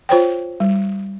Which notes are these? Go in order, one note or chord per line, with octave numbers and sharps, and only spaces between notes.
F4 C5 C#5 G5
G3